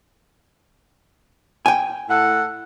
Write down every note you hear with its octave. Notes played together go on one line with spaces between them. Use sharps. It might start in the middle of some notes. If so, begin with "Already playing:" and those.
G5 G#5
A2 A4 F#5